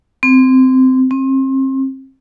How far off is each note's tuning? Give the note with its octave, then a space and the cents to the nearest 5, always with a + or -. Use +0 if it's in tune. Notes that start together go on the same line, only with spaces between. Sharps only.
C4 -15
C4 +35